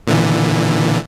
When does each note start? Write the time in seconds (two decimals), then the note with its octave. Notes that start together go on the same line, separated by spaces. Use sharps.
0.07 A#2 D3 E3